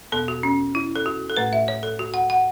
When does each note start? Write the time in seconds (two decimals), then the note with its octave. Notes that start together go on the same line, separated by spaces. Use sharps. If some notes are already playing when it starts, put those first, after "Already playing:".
0.12 E2 B2 B3 A4
0.28 F#4
0.43 C#4
0.75 E4
0.96 A4
1.06 F#4
1.30 A4
1.37 A2 A3 B4
1.53 E5
1.68 C#5
1.83 A4
1.99 F#4
2.14 F#5
2.30 F#5